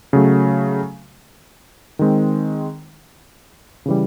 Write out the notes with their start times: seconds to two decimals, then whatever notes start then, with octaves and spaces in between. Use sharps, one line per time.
0.13 C#3 F#3 A3
1.99 D#3 G#3 C4
3.86 C#3 E3 G3